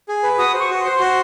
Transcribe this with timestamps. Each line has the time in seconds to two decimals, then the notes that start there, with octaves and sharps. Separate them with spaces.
0.09 G#4
0.23 B4
0.38 F#4 D#6
0.53 C5
0.60 C#6
0.70 F#4
0.80 C6
0.85 C5
1.00 F#4